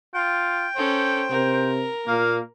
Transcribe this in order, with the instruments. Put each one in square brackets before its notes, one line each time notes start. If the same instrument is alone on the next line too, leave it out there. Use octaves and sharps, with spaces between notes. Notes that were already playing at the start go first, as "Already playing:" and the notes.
[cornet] F4 [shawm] G5
[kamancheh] C#4 A4 [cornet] C5
[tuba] C3 [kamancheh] A#4
[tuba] A#2 [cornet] A#3 [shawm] F5